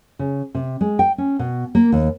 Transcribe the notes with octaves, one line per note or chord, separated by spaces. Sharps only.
C#3
C3
G#3
G5
C#4
B2
A#3
D#2